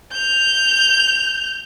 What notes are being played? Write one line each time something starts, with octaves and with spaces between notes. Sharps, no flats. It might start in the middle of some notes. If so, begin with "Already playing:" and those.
G6 F7